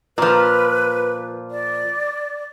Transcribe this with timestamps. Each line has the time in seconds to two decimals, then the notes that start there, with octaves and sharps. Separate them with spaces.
0.18 A#2 F3 B4
1.51 D5